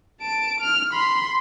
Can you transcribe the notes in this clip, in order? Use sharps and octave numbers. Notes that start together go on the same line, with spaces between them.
A5 D7
F6
B5 C6